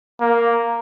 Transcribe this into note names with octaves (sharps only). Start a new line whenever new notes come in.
A#3